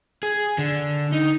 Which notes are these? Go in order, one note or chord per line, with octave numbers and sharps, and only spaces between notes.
G#4
D3
D#4